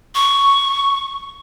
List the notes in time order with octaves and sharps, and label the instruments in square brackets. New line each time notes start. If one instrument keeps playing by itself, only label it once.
[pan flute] C#6